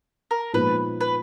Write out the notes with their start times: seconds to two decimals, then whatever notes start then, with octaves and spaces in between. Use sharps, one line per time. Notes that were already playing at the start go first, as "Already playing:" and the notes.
0.31 A#4
0.53 A#2 F3 G#3 B3 D#4 B4
1.01 B4